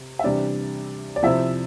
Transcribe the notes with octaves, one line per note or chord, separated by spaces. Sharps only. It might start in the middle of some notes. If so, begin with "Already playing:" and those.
Already playing: C3
E5
C3 E3 G3 D4 D5
D5
C3 F3 E4 E5